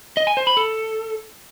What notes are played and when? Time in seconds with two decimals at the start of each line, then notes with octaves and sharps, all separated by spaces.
0.17 D#5
0.27 G#5
0.37 C5
0.47 B5
0.57 A4